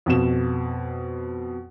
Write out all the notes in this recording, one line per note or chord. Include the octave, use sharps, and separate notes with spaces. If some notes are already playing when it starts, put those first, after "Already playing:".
F2 B2 E7